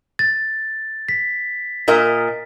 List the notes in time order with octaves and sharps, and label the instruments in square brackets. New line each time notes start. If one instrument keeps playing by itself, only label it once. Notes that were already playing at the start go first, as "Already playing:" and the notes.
[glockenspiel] A6
B6
[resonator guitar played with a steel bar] A#2 A#4 D#5